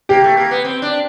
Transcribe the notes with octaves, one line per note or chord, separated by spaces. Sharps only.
A#3 G4
A3
A#3
B3
C4
D4